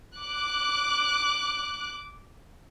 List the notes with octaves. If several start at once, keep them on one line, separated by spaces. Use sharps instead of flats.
D6 F#6